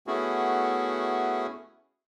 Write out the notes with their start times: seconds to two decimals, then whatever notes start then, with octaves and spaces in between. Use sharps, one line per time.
0.07 A3 B3 C#4 E4 F#4 G#4